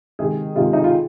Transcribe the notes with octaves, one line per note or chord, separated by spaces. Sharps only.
C#2 C3 D#3 G#3 G#4
C#2 C3 D#3 G#3 F4
D#4
F4